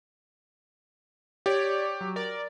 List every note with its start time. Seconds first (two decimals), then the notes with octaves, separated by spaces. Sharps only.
1.46 G4 C#5 D5
2.01 F#3
2.16 A#4 D5